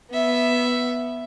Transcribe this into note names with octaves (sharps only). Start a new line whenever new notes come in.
B3 E5